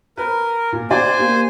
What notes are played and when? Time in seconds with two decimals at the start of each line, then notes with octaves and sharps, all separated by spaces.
0.17 A#4 B4
0.72 A#2
0.90 C5 D5 G5 G#5
1.19 A#3 G4